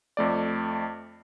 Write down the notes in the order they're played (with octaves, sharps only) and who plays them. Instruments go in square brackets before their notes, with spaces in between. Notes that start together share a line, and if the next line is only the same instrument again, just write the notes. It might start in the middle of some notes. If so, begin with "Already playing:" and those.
[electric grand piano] F2 A3 D5